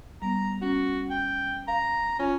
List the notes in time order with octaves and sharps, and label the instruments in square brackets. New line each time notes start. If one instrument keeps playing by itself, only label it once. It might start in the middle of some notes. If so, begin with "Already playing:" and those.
[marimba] G3 B3 [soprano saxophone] A#5
[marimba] C#4 [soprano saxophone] F#4
[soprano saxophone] G5
[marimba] F5 [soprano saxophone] A#5
[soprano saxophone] C#4 [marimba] F4